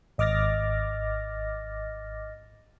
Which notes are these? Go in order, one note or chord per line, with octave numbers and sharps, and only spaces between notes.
G#1 D#5 D6 F6 A6 A#6